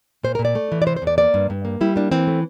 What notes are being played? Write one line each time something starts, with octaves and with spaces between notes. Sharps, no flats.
A#2 C5
A#2 A#4
D5
A3
E3
D5
C3 C5
C5
E2
D5
A#3 D5
G2
G2
A#3
G3 E4
A#3 D4
E3 C4
A3